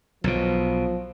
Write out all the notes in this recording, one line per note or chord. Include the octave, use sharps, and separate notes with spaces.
B1 B2 F3